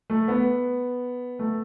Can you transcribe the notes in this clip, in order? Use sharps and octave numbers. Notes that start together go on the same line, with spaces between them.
A3
B3
A3